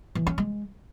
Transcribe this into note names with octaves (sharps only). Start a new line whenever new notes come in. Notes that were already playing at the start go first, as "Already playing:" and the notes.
E3
C#4
G#3